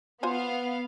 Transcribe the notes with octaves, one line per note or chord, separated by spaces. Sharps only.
B3 F4 C5 F5 G#5